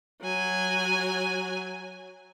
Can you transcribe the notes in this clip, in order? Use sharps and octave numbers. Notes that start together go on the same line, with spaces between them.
F#3 G#5